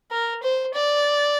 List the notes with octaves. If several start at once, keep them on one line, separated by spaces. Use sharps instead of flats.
A#4
C5
D5